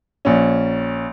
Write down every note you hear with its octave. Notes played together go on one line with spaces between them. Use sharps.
A#1 C#4